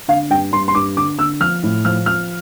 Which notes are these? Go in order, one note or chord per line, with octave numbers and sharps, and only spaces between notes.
D3 F5
G2 G5
G2 C6
C6
G2 D6
D3 D6
D3 E6
F3 F6
A2
F3 F6
F3 F6